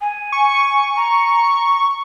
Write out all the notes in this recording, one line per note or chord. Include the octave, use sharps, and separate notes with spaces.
G#5
C#6
A#5